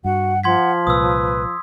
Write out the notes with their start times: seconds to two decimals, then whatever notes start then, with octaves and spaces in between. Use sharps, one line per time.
0.05 G2 F#4 F#5
0.44 F3 F#5 C6 G#6 B6
0.87 C2 A#2 B4 D#6 E6